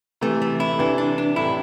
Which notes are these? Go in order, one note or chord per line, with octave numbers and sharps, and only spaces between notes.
C3 E3 A3
A3
E4
C3 E3 D4
D4
D4
A2 C3 E4